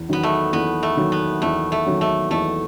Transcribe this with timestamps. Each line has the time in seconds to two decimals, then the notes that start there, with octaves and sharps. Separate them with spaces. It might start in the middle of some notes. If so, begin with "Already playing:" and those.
Already playing: E2
0.09 D#3 F#3 B3
0.23 A3
0.53 E2 B3
0.83 A3
0.97 D#3 F#3
1.12 B3
1.42 E2 A3
1.72 A3
1.86 D#3 F#3
2.01 A3
2.31 E2 A3